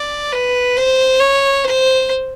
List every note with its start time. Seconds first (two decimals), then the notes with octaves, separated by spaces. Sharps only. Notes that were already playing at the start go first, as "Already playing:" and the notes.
Already playing: D5
0.32 B4
0.77 C5
1.20 C#5
1.65 C5